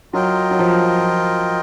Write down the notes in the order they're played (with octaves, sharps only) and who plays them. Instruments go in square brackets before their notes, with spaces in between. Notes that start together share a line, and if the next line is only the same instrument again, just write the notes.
[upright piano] F#3 [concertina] F4 A#4 D#5 G5
[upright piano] F#3
F3